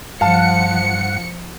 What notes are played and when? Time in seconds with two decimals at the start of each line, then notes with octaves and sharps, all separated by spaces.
0.21 G2 F3 F5 F#5 A5 C#7